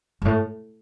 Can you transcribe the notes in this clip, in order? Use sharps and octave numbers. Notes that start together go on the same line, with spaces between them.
G2
A2